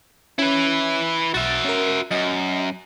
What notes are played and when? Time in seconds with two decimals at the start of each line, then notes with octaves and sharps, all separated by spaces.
0.39 C#4 E4 B4
1.34 B1 F#4 E5 A6
1.65 C#4 A#4
2.11 F#2 D#5